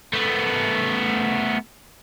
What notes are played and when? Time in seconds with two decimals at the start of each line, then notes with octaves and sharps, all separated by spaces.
0.13 A3 B3